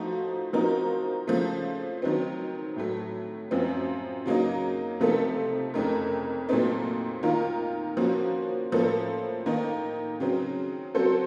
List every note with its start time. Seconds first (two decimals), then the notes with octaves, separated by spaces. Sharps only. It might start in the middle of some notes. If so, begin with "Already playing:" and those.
Already playing: F3 A3 D#4 F#4
0.53 F3 C4 D#4 F#4 A#4
1.27 C#3 F3 A3
2.02 D#3 F#3 C4
2.76 A2 F#3 A3
3.51 F#2 F3 C4
4.26 C#3 F#3 A#3 D#4
5.00 C3 F3 A3 D#4 A4
5.74 F2 C#3 A3 D#4 A#4
6.49 A#2 F#3 A3 C4 D#4
7.23 D#3 A#3 F4 A#4
7.97 F3 A#3 C#4 F#4
8.72 A2 F3 A#3 C#4 A4
9.46 D#3 A#3 D#4
10.20 C#3 F#3 C4
10.95 F#3 C4 F#4 A4 C5